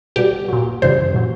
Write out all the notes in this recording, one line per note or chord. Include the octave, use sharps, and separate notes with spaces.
B2 G3 G4
A#2 F#3
F#2 C#3 E3 G3 C5
A#2 F#3